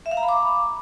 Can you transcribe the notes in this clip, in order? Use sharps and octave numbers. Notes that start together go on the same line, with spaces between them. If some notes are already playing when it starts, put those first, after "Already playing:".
E5
F5
A#5
B5
D6